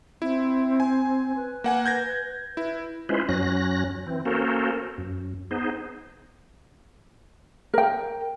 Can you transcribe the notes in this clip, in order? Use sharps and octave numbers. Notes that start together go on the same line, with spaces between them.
C4 E4
G#5
B4
A#3 F#5 G#5
G6 G#6 A#6
E4 B4
G#3 C#4 E4 F4 B4 C5
F#2 F#3 C#4 F#6 A#6
E3 C4
A#3 C#4 F#4 A4 A#4 C5
F#2
B3 D#4 G#4 C5
A#4 G5